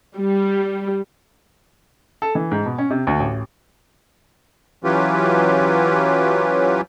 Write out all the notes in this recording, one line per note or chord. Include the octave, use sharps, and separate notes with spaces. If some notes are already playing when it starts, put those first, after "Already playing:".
G3
A4
E3
G#2
B2
C#4
C3
D2
A1
E3 F#3 C#4 F4 G4 B4